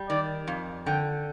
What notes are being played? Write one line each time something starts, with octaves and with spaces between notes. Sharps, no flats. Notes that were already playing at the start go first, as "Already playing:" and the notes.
Already playing: G3
D#3 D5
F2
D3 G5